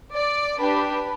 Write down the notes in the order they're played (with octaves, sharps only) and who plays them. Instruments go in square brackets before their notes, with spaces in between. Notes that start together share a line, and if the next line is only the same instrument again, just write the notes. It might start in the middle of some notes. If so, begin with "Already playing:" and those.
[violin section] D5
D4 G4 B4